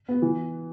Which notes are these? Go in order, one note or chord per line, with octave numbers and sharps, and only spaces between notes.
B3
E3